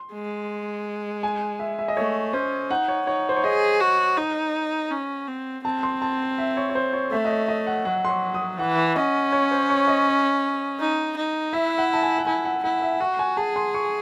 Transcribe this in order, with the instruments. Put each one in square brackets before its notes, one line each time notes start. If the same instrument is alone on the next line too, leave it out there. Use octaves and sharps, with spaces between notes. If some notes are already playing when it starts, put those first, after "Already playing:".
Already playing: [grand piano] C6
[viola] G#3
[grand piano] G#5
E5
E5
D#5
[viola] A3 [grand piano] C#5
[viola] C#4 [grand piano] C5
[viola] D#4 [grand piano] F#5
[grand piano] C#5
[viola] D#4 [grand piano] C#5
[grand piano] C5
C#5
[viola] G#4 [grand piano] D#5
[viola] F#4
D#4
C#4
C4
[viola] C4 [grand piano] A5
[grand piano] C6
A5
E5
C#5
C#5
C5
C#5
[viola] A3 [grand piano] E5
[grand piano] D#5
C#5
D#5
F#5
[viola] F#3 [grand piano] F#5
[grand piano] C6
C#6
D#6
[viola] E3 [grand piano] F#5
[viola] C#4 [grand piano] D#5
[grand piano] C#5
C5
C#5
D#5
[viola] D#4
D#4
[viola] E4 [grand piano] E5
[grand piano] F#5
A5
G#5
F#5
[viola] E4 [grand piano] G#5
[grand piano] F#5
[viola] E4 [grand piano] F#5
[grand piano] E5
[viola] F#4 [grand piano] F#5
[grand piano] G#5
[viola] G#4 [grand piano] A5
[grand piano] C6
C#6